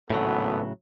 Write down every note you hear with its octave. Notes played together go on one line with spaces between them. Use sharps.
G#1 D2 A2 C#3 F#3 B3 A4